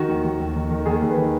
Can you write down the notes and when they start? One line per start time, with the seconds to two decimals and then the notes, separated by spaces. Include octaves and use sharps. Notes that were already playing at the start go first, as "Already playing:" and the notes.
Already playing: D#3 F#4
0.09 D#2
0.25 D#2
0.40 D#2
0.56 D#3
0.70 D#3
0.86 D#2 G#4
1.02 D#2
1.09 B4
1.17 D#3